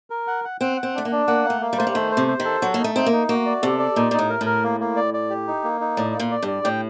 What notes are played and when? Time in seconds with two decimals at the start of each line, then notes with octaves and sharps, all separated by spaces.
0.10 A#4
0.27 F#5
0.45 F#5
0.61 C4 F#5
0.77 F#5
0.83 C4
0.95 A3 D4
1.05 A#3
1.11 D4
1.28 A#3 F#5
1.45 A#3
1.50 A3
1.61 A#3
1.73 G3
1.78 A3 C5
1.87 G3
1.95 D#3 A3
2.12 C5
2.17 C3
2.28 C5
2.40 D#3
2.45 A4
2.61 F#3 F#4
2.74 A#3
2.79 D#4
2.84 A3
2.95 C4 D#4
3.06 A#3
3.12 D#4
3.29 A#3 F#4
3.46 D5
3.62 C3 A4
3.79 D5
3.96 A#2 D#4
4.11 A#2 D#4
4.19 A2
4.30 A#4
4.41 A2
4.46 A#4
4.64 A#3
4.80 A#3
4.96 D5
5.14 D5
5.30 G4
5.48 D#4
5.64 A#3
5.81 D#4
5.97 A2 D5
6.14 A#3
6.20 A#2
6.31 D5
6.43 G2 D5
6.64 A2 G5